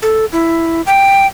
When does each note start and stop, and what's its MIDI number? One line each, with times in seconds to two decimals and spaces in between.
0.02 0.25 69
0.32 0.82 64
0.86 1.26 79